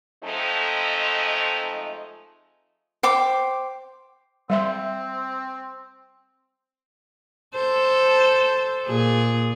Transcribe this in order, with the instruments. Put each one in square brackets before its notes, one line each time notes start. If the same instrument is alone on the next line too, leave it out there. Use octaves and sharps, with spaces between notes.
[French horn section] F3 G#3 A3 C4 D#4
[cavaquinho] C5 G5 D6
[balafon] G3 E5 C6 [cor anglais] C4
[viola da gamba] A4 C5
A#2 G#4